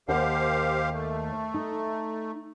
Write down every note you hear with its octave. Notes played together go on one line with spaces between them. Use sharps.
D#2 G4 A#4 C5 F5 F#5
A3
D#4